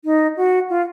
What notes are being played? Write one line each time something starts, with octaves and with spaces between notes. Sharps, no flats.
D#4
F#4
F4